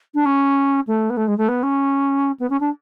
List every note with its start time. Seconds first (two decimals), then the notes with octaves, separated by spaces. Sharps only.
0.14 D4
0.25 C#4
0.87 A3
1.10 B3
1.17 A3
1.27 G#3
1.37 A3
1.48 B3
1.63 C#4
2.39 B3
2.50 C#4
2.60 D4